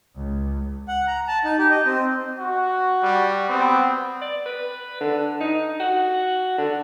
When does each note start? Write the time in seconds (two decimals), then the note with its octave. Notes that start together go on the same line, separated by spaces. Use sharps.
0.16 C#2
0.88 F#5
1.07 A#5
1.28 A5
1.45 D#4
1.59 G4
1.71 D#5
1.86 C4
2.39 F#4
3.03 G3
3.50 B3 C4
4.21 D5
4.46 B4
5.01 D3
5.40 D#4
5.80 F#4
6.58 D3